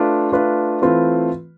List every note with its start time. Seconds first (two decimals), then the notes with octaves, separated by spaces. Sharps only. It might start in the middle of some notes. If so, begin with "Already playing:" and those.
Already playing: A3 D4 F4 B4
0.32 A3 D4 F4 B4
0.82 E3 A3 C4 F4 B4